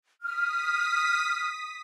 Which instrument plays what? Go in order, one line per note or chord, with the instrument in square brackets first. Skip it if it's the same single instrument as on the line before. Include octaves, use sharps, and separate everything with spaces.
[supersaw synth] D#6 B6 [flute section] F6